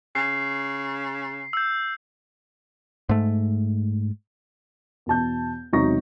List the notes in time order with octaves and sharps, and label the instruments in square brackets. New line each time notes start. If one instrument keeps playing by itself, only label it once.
[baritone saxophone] C#3 [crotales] C7
[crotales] E6 G6
[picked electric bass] G#2 A3
[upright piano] E2 B2 A5 G6
E1 C3 F#3 D#4 C#6 A#6